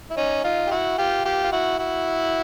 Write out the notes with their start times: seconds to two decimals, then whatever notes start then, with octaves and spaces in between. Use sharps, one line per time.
0.10 E4
0.17 C#4 D#4
0.44 D#4 F4
0.67 G4
0.71 E4 F#4
0.98 F4 G4
1.25 F4 G4
1.43 F4
1.52 E4 F#4
1.79 E4 F#4